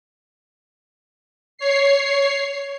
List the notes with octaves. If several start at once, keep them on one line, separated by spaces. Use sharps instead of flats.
C#5 C7